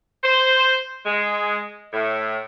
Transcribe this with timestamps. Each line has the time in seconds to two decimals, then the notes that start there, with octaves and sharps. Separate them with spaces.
0.24 C5
1.06 G#3
1.93 A2